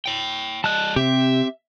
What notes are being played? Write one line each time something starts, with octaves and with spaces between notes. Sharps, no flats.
C#5 G5
G3 D#5 A5 F#6
C3 C4 G4 E5